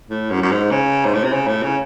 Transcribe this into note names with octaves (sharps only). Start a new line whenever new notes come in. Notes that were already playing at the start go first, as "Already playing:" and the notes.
A2
F#2
F#2
G#2
C#3
G#2
A2
C3
C#3
A2
C#3